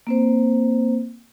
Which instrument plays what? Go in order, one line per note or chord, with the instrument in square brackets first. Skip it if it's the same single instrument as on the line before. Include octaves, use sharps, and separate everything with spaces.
[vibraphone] A#3 C4 C5